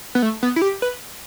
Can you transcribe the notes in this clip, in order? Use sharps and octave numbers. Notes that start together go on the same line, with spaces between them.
B3
A3
B3
E4
G4
B4